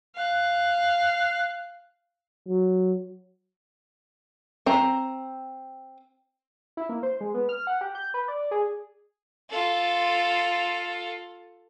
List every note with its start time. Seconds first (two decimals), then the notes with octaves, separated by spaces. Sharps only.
0.16 F5 F#6
2.48 F#3
4.66 C4 A#5
6.77 E4
6.89 A#3
7.03 C5
7.21 G#3
7.34 B3
7.49 F6
7.67 F#5
7.81 G4
7.95 G6
8.14 B4
8.28 D5
8.51 G#4
9.51 F4 A4